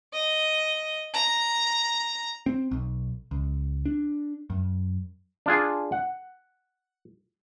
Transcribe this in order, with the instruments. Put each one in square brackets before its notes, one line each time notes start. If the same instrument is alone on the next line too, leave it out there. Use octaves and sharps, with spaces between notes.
[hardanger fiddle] D#5
A#5
[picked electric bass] C4
B1
C#2
D4
F#2
[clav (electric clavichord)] D4 F4 G#4
F#5